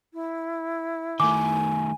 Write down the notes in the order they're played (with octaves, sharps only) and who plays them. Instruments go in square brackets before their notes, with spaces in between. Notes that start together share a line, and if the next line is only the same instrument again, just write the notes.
[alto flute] E4
[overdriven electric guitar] D#3 A3 [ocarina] G#5 [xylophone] D6